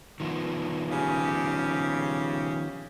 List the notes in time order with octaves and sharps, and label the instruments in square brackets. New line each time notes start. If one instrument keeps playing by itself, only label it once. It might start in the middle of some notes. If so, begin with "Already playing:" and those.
[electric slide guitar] D#3 F3 B3
[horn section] C#3 G4